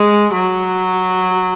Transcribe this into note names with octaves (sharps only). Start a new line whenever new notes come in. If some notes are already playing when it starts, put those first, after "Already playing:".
Already playing: G#3
F#3